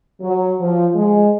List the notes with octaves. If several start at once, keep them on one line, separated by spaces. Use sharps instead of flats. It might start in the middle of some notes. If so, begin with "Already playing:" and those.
F#3
F3
G#3